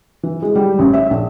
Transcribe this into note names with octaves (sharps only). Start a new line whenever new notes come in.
E3
G#3
G3
A1
E5
A#1